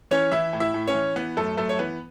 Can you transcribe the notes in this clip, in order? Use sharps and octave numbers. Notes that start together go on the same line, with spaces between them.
E3 C#4 C#5
E3 E4 E5
A2
E4 E5
A2
C#4 C#5
E3
E3 B3 B4
F#2 A3 A4
F#2 A3 A4
C#5
E3 B3 B4